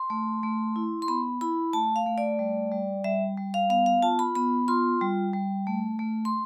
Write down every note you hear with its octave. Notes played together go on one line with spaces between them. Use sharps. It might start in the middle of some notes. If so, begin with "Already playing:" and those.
Already playing: C6
A3
A3
E4
C6
B3 B5
E4 B5
A3 A5
F5
A3
D5
G3
G3
G3 E5
G3
F5
B3 F5
F5
F4 A5
B5
B3 B5
F4 C6
G3
G3
A3
A3
C6